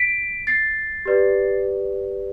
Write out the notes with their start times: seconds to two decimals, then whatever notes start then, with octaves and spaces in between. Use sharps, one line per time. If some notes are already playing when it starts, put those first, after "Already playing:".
Already playing: B6 D7
0.47 A6 C7
1.05 G4 B4 D5